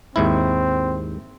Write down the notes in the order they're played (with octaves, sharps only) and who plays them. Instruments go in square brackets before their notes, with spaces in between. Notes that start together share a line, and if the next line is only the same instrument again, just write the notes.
[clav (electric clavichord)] D#2 G#2 E4 [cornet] C4